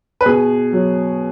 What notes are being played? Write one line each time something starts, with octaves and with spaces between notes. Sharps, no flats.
B4
B2 G#4
F#3